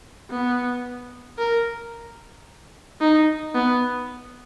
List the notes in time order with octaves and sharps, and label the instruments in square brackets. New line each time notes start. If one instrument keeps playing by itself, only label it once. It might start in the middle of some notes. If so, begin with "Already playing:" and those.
[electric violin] B3
A#4
D#4
B3